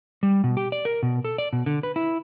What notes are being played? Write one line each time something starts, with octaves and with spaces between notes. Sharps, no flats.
G3
B2
G4
D5
A#4
B2
A4
D5
B2
D3
B4
E4